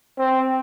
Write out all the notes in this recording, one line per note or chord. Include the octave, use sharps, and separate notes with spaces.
C4